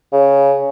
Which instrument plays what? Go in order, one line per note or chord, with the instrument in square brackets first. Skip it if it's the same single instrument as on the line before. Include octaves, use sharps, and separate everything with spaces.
[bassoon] C#3